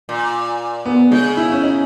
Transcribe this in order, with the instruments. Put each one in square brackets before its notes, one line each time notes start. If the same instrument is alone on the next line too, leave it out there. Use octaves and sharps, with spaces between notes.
[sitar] A#2
[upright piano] B3
[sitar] C#3 [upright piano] G#3
[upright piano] E4
C#4
D#4